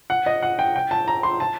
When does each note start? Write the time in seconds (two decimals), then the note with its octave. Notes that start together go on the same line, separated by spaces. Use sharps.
0.10 F#5
0.26 D#5
0.42 F#5
0.59 G5
0.76 G5
0.91 A5
1.08 A#5
1.23 C6
1.40 A5